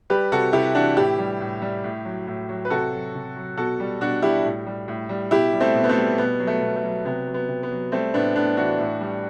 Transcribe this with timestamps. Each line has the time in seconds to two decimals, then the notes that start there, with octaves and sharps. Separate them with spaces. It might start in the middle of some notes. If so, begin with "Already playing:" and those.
0.10 G3 G4 B4
0.32 C3 F#4 A4
0.53 C3 E4 G4
0.75 E3 D4 F#4
0.97 A2 E4 G4
1.19 G3
1.41 A2
1.62 G3
1.84 A2
2.05 F#3
2.27 A2
2.49 F#3
2.65 B4
2.70 C3 F#4 A4
2.92 F#3
3.15 C3
3.36 F#3
3.57 B2 F#4 A4
3.80 G3
4.01 B2 D4 F#4
4.22 G3 E4 G4
4.45 A2
4.66 G3
4.88 A2
5.09 G3
5.31 B2 E4 G4
5.53 G3
5.60 A3 C4
5.75 B2
5.84 B3
5.89 A3 C4
5.97 G3
6.18 B2 B3
6.40 F#3
6.47 A3
6.61 B2
6.76 A3
6.83 F#3
7.05 C3 B3
7.27 F#3
7.34 B3
7.48 C3
7.63 B3
7.71 F#3
7.92 G3 A3 C4
8.14 A2 B3 D4
8.35 A2 B3 D4
8.57 E3 D4 F#4
8.79 A2
9.00 G3